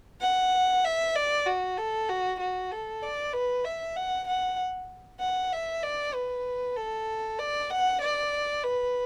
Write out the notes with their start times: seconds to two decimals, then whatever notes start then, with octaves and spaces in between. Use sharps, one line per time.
0.21 F#5
0.84 E5
1.15 D5
1.46 F#4
1.78 A4
2.09 F#4
2.40 F#4
2.71 A4
3.02 D5
3.33 B4
3.65 E5
3.96 F#5
4.28 F#5
5.20 F#5
5.52 E5
5.83 D5
6.14 B4
6.76 A4
7.39 D5
7.70 F#5
8.01 D5
8.64 B4